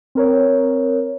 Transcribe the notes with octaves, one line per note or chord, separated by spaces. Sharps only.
C4 A#4 C#5